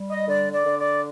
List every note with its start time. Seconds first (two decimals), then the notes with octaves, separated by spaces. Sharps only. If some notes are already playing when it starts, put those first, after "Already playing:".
Already playing: G3
0.09 D#5
0.28 D3 D5
0.53 D5
0.65 D3
0.79 D5